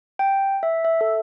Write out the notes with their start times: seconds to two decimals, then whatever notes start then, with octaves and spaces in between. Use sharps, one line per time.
0.19 G5
0.63 E5
0.85 E5
1.01 A4